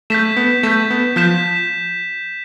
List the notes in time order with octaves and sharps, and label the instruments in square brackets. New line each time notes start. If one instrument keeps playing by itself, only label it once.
[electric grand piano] A3 [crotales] G6 B6 E7
[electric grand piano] B3
[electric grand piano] A3 [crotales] G6 B6 E7
[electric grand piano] B3
[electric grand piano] F3 [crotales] G6 B6 E7